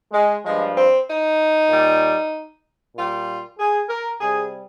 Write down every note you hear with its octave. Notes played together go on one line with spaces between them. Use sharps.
G#3
G2 F3 G#3
C4
D#4
A#2 G3
A#2 G3 F4
G#4
A#4
C3 G3 G#4